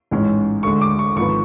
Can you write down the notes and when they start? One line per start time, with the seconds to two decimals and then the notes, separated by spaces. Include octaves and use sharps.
0.11 A1 G#2 G#3 C#4
0.63 D2 D3 G#3 C#6
0.81 D6
0.99 C#6
1.16 G#1 G#2 F3 B3 C#6